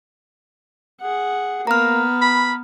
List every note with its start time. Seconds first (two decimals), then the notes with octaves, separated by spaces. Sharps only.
1.01 G#4 F#5
1.67 A#3 B3 B4 A#5 F6
2.21 B5